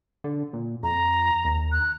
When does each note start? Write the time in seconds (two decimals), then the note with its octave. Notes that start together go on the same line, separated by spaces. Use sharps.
0.24 D3
0.53 A#2
0.83 F2 A#5
1.45 D#2
1.72 F#6